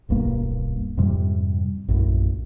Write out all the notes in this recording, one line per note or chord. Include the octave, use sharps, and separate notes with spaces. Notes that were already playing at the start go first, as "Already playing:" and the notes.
D1 B1 G2 A#3
F2 G#2 C3 G3
A#1 F#2 A2